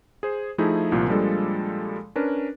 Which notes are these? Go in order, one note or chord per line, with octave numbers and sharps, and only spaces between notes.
G#4 C5
F3 A3 D#4 E4 G#4
C2 A#2 F3
A#2 F3 G3 G#3 D4 A4
C#4 D4 A#4 B4